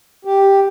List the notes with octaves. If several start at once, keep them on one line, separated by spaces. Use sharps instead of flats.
G4